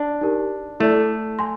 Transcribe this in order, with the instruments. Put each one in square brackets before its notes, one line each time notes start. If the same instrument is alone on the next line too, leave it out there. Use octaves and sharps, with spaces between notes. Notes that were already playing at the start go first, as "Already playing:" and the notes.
Already playing: [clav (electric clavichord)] D4
[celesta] D#4 G4 A#4
[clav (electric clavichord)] A3 [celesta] E4 A4 D5
[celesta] G#5 C6